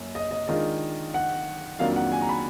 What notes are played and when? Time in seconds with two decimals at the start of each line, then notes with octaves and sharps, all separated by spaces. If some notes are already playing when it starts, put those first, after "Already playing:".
Already playing: F#2 A#3
0.15 D#5
0.31 D#5
0.48 D#3 G#3 D4 F4 D#5
1.14 F#5
1.79 F2 D#3 F#3 A#3 D4 F5
1.96 F#5
2.12 G#5
2.21 A#5
2.29 B5